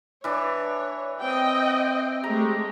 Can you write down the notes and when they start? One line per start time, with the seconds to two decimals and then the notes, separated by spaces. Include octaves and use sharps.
0.24 E3 D4 C#5
1.21 C4 D#5 G5
2.24 G#3 A3 G4 A#5